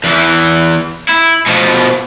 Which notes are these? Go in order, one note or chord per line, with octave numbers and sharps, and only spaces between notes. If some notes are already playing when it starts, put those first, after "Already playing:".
E2 E3
E4
B2 F3